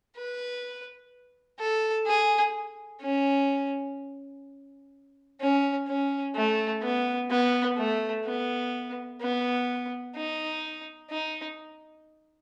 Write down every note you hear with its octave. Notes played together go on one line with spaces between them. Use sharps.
B4
A4
G#4
C#4
C#4
C#4
A3
B3
B3
A3
B3
B3
D#4
D#4